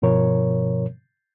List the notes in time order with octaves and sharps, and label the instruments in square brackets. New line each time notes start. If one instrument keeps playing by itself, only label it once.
[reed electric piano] G2 B2 F3 A#4 C#5